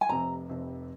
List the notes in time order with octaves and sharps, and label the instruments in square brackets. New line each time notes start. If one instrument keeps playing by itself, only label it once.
[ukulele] G#5
[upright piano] F1 F2 C3 [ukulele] A#5
[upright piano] F1 F2 C3